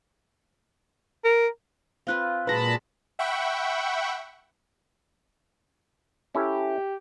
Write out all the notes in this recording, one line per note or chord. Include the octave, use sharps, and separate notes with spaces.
A#4
C4 F4 B4 F5 F#6
A#2 F#3 G#3 B4 A5 B5 A#6
E5 F#5 G5 B5 C#6
C#4 E4 G4 A4